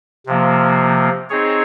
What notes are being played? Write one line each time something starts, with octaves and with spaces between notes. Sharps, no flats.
C3 F3 A#3
C4 D#4 G#4 C#5